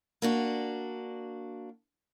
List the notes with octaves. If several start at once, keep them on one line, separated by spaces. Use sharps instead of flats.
A#3 D4 F#4